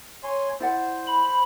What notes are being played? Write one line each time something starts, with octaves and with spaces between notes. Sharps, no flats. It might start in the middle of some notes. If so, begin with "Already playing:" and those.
C#5 G#5 C6
E4 C5 D5 F#5
B5